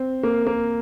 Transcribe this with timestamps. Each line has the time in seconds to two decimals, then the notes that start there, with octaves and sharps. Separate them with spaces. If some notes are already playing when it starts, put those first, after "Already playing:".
Already playing: C4
0.23 A#3
0.47 A#3